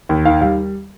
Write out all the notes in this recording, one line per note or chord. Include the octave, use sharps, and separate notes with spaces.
D#2
D#3 F5
G3 F5